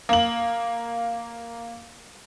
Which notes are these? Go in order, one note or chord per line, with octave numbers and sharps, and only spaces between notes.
A#3 F#7